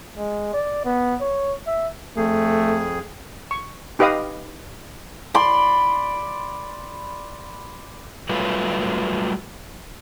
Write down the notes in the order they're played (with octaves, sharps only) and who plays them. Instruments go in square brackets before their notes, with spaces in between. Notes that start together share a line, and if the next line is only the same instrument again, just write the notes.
[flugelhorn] G#3
D5
B3
C#5
E5
[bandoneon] F2 G#4 [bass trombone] A3
[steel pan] C#6
D#4 G4 B4 D#5 F5 D#6
[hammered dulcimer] D5 B5 C6
[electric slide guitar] F#3 G3 A3 F4 B4